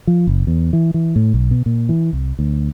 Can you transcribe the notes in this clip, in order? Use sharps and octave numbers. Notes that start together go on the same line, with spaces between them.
F3
F#1
E2
E3
E3
A2
B1
B2
A#2
E3
C2
D2